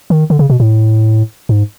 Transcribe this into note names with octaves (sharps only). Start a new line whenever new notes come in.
D#3
D3
C#3
B2
A2
G#2